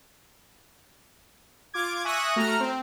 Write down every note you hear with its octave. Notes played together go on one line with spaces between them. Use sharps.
F4 D6 G#6
E5 G#5 C#6 D#6 F#6 A#6
A3 F#4 A#5 F6
C4